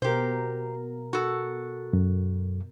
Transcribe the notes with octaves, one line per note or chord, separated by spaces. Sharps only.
B2 G4 A#4 C5
F#4 A4
F#2